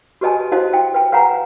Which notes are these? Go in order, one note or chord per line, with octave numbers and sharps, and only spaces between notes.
F#4 G4 B4 D#5 G#5 A5
E4 F#4 C5 D#5 F5 A5
G5
B4 G5
B4 F5 F#5 G#5 A#5